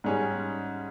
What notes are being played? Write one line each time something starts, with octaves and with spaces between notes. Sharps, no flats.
G#2 G3 C#4 G#4